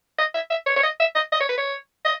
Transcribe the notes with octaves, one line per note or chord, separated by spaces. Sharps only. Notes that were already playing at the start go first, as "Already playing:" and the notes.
D#5
E5
E5
C#5
C#5
D#5
E5
D#5
D#5
C#5
B4
C#5
D#5